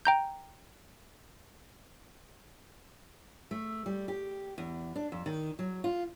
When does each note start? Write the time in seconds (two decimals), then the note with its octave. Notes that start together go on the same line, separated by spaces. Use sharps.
0.05 G5 A#5 G6
3.51 A3
3.86 G3
4.08 G4
4.58 E2
4.96 D4
5.12 F2
5.26 D#3
5.59 F#3
5.84 F4